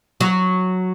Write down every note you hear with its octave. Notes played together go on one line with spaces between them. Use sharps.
F#3